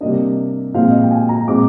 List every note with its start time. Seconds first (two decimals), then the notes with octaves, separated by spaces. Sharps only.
0.01 C3 G3 A#3 D4 D#5
0.74 A#2 F3 G#3 C4 F5
0.90 D#5
0.97 F5
1.04 G5
1.11 G#5
1.29 A#5
1.47 A#2 G#3 C4 D6